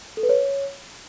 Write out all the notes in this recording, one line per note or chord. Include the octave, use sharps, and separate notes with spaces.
A4
B4
C#5